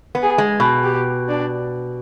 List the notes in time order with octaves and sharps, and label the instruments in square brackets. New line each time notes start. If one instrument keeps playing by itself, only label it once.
[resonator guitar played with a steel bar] B3
[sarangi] G#4
[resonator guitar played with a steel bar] G#3
B2
[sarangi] G4
D4